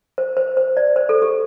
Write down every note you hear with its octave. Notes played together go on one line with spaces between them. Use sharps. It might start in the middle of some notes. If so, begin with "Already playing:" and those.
C5
C5
C5
D5
C5
A4
G4